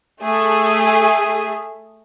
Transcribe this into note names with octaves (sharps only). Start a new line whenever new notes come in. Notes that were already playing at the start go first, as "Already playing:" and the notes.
A3 G#4